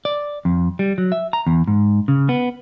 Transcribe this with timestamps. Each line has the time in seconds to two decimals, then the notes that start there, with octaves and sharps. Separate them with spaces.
0.05 D5
0.45 F2
0.79 G3
0.98 F#3
1.12 E5
1.33 A#5
1.47 E2
1.68 G#2
2.08 C#3
2.29 B3